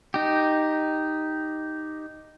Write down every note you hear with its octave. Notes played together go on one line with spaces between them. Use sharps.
D#4 G4